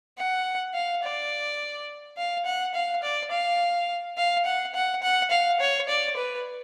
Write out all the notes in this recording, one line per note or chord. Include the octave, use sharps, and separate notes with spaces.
F#5
F5
D5
F5
F#5
F5
D5
F5
F5
F#5
F#5
F#5
F5
C#5
D5
B4